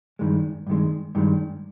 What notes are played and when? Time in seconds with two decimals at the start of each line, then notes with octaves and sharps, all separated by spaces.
0.19 G2 D#3 G#3
0.67 G2 D#3 G#3
1.15 G2 D#3 G#3